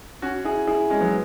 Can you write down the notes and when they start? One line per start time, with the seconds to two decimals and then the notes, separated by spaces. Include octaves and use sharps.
0.22 C#4 F#4
0.45 E4 G#4
0.67 E4 G#4
0.90 G#3 C#4
1.01 F#3 B3